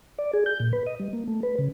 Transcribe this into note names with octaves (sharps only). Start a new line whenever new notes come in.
D5
G#4
G6
A#2
B4
D#5
G3
A#3
A3
B4
C#3